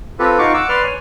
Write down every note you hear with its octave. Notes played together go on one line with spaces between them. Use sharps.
C4 F4 G4 A4 B4
D#4 F4 F#4 F5 C#6 D6
F#5 D6 E6
B4 D5 C6 F6
C#5 G#5